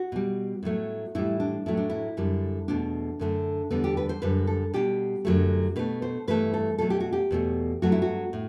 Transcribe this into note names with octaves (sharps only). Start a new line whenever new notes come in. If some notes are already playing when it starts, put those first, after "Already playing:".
Already playing: F#4
B2 G3
A2 F#3 A3
A2 E3 G3 E4
D4
A2 F#3 A3 E4
D4
E4
F#2 D3 G3
E2 B2 A3 D4
F#2 D3 A3
E2 D3 G3 B3
G4
B4
C5
F#2 D3 G3 B4
A4
B2 G3 G4
F#2 D3 F#3 A3
B2 A3 B4
C5
G2 E3 A3 B4
A4
B2 F#3 A3 A4
G4
F#4
G4
E2 B2 A3
G2 F#3 A3 F#4
E4
F#4
A2